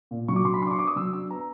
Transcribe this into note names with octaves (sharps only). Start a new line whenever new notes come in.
A#2
F#3 C#6
D6
F#3 C6
B5
D4 C6 D6
C#6
B3 D6
D#6
F#3 E6
D4 E6
B3 A#5